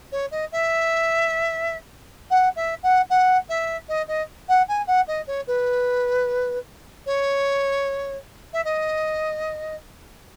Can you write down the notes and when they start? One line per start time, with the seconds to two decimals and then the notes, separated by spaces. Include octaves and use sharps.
0.12 C#5
0.31 D#5
0.52 E5
2.30 F#5
2.56 E5
2.83 F#5
3.10 F#5
3.49 E5
3.89 D#5
4.08 D#5
4.49 F#5
4.68 G#5
4.87 F#5
5.08 D#5
5.27 C#5
5.47 B4
7.06 C#5
8.53 E5
8.65 D#5